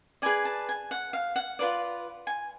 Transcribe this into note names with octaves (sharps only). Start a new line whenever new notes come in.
G#4 B4 D5 G#5
A5
G#5
F#5
F5
F#5
F4 B4 D5
G#5